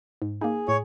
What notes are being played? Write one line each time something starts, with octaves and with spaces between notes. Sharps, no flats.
G#2
A#3 D#4 G#4
A2 C#5